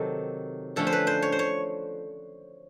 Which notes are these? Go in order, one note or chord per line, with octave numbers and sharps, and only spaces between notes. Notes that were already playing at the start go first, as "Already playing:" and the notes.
Already playing: C3 D#3 F#3 A4
D3 F3 A3 C#4 A4
C5
B4
C5
C#5
C5
C#5